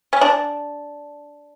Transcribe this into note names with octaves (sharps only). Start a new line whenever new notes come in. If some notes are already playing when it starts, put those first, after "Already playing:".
C#4
D4